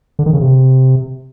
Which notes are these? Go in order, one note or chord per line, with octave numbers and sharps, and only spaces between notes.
D3
D#3
C#3
C3